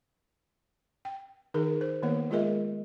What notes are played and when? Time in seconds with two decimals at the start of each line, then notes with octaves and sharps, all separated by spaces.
1.05 G5
1.54 D#3 D#4 G#4 A#4
1.81 C5
2.03 D#3 A#3 B3 C#5
2.30 G#3 F4 G#4 A#4 D#5 E5